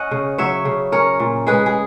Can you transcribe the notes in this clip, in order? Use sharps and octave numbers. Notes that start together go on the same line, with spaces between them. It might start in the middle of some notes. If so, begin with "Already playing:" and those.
Already playing: C#4 D#5 F#5
C#3
F#3 C#5 E5
C#3
C#4 A#4 C#5
A#2
G#3 G#4 B4
G#4